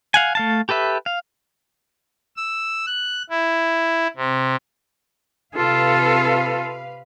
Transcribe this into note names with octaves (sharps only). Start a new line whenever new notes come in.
F5 F#5 G#5
A3 F5 A5
G4 A4 B4 E5
F5
E6
F#6
E4
C3
C3 F4 A4 B4 F5